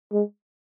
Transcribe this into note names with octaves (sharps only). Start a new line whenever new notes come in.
G#3